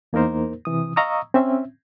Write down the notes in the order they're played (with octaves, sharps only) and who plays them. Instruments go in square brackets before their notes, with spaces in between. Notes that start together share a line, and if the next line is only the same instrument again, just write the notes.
[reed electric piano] E2 A#3 D#4 A#4 C5
C3 E3 D#6
D#5 F5 A#5 C#6 D#6 E6
C4 C#4 E5